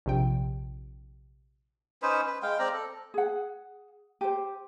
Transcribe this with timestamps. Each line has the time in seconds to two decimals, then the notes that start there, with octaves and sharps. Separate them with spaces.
0.06 A#1 C3 G5
2.02 C#4 D#4 B4 C5
2.27 B4
2.42 G#3 F5 G5
2.59 C4 D5 A#5
2.73 A4
3.14 G#4 F#5
4.21 G4 C5